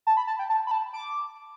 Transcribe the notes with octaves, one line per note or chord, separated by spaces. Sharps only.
A5
B5
A5
G5
A5
B5
A5
D6